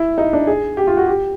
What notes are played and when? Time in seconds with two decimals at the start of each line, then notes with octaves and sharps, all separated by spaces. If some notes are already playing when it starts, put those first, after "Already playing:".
Already playing: E4
0.18 D#4
0.33 D4
0.47 G#4
0.77 G4
0.87 F4
0.97 F#4
1.07 G4